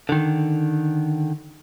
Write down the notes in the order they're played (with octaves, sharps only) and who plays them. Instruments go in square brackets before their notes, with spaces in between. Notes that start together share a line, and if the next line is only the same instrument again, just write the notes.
[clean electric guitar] D3 D#3